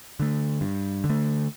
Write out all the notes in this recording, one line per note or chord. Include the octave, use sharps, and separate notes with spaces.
D3 A3
G2
D3
A3